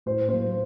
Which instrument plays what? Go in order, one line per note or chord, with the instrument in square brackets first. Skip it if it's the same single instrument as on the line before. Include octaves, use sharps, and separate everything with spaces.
[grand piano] A2 C5
F#3 A#3 C5